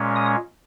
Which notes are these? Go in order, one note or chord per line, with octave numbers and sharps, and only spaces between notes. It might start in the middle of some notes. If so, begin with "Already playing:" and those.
Already playing: A#2 G#3 C#4
D#6